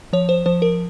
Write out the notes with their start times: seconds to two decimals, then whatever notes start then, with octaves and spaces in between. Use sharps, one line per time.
0.13 F3 C#5
0.29 C5
0.46 F3 C5
0.62 A#4